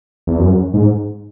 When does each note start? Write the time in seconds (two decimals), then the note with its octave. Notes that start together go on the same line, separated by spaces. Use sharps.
0.27 E2
0.40 F#2
0.74 G#2